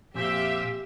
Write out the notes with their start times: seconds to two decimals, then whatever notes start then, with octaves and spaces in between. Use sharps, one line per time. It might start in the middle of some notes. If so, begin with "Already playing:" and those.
0.14 F2 A#2 G4 C5 E5 F5